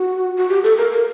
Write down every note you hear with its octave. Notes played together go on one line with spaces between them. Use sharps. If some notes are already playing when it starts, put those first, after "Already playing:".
Already playing: F#4
F#4
G4
A4
A#4
A#4